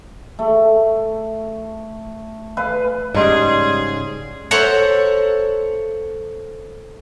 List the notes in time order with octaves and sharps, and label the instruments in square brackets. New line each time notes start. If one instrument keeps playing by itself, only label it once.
[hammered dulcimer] A3
B4 F5
[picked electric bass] G#2 C#3 [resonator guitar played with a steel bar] G3 [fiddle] G#4 [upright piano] D#5 C6
[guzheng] A4 C5 C#5 E5 F#5 A#5